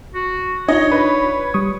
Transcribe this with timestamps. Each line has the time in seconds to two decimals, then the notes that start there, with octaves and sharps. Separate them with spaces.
0.15 F#4
0.68 D4 D#4 F4 C#5 D#5
0.91 B4
1.54 G3 C#6 D#6